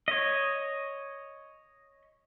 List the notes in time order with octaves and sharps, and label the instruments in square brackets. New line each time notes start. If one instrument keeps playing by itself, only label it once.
[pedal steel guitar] C#5 D#5